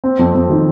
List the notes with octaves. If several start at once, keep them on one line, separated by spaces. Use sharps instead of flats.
C4
F2
F2
D#3